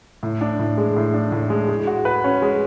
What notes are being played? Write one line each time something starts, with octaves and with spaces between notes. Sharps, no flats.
A2
D4
A2
G#3
A2
D4
A2
G#3
G#3
F#4
B4
C#4
G#3